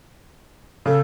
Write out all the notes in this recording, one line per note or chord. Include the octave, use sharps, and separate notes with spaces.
C#3 A4